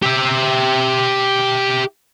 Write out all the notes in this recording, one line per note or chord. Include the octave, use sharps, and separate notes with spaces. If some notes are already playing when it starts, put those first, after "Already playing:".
G4 E5